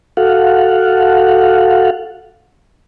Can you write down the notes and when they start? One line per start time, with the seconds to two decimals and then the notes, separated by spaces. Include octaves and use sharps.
0.17 F#4 A4 F5 F#5